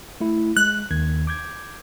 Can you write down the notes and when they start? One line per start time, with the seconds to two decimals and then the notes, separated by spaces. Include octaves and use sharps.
0.20 A3 E4
0.57 G#3 F#6
0.91 D#2 D#3 G#6
1.27 D6 G6 G#6